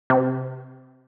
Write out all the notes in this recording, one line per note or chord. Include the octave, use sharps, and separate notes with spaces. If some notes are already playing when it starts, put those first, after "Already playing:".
C3